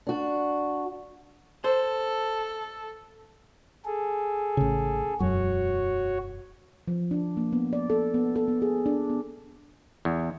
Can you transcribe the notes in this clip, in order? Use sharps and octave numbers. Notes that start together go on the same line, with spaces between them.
D4 F#4
A4 C5
G#4 A4
A1 C#3
E1 F#2 F#4 C#5
F3
D4
A#3
B3
D5
A4
B3
A4
B3
G#4
D4
B3
E2